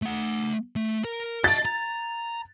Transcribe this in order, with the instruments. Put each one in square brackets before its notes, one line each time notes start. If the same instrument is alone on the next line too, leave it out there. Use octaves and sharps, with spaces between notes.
[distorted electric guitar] A3 F#5
A3
A#4 A#5
[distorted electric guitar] D#5 A5 [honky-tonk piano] A6
[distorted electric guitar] A#5